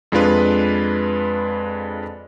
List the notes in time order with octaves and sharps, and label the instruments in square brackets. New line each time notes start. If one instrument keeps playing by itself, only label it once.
[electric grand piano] F2 G#3 D4 F4 B4